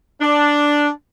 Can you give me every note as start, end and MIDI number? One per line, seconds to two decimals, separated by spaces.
0.21 0.89 62